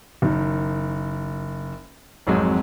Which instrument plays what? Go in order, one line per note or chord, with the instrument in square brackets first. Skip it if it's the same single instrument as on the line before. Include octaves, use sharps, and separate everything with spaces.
[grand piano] F#1 D#3
G#1 F2 F#3 G#3